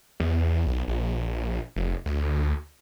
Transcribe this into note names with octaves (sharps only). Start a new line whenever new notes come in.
E2
B1
A#1
F1
D2